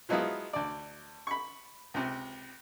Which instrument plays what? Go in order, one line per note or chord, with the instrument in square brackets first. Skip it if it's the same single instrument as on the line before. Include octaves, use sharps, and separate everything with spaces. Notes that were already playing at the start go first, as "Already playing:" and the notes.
[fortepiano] F3 F#3 G#3 B3 E4 F4
D2 D5
B5 C#6
C#2 C3